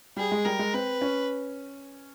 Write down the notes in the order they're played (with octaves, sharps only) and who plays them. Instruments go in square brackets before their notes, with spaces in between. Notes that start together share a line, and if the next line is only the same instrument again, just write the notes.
[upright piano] G3 [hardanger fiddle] G#4
[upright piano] G#3
[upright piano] G3 [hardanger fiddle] A#4
[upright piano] G#3
[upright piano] C4 [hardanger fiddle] B4
[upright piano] C#4